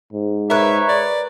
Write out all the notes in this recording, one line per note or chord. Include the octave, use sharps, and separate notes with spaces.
G#2
A#4 B4 C#5 E5
D5